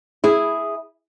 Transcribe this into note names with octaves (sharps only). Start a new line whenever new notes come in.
E4 G#4